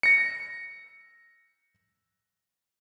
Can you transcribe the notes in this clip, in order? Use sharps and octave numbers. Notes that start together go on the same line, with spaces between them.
A#6 C#7